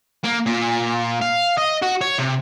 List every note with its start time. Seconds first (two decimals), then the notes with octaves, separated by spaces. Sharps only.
0.24 A#3
0.47 A#2
1.21 F5
1.58 D#5
1.82 F#4
2.01 C#5
2.19 C3